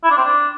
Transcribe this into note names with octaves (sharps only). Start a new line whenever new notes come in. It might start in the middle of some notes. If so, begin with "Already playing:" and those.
E4
D4
C4
D4